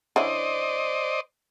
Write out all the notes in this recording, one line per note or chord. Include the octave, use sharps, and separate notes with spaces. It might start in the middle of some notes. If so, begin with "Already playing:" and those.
D3 C#4 E4 C5 D5 D#5